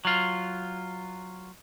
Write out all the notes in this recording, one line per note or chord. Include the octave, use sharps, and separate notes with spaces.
F#3 F4